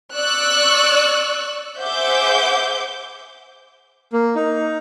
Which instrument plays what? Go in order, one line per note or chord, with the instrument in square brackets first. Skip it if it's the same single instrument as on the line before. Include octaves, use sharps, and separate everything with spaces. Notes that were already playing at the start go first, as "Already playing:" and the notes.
[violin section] D5 C#6 E6 F#6
G#4 C5 E5 F#5 D6 G6
[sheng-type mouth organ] A#3
D#4